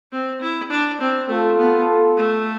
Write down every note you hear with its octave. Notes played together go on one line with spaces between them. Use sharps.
C4
E4
D4
C4
A3 F4 A4
B3
A3